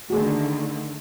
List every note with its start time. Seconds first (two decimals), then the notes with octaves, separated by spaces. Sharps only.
0.10 D3 D#3 A3 F#4 G#4